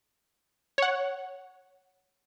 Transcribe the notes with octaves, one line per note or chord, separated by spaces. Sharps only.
C#5 F#5